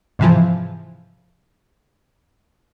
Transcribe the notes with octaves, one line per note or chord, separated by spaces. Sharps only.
G#2 C3 E3 F3